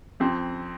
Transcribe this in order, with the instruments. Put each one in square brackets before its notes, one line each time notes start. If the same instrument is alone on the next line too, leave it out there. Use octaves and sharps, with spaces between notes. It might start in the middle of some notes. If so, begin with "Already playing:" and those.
[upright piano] F2 C4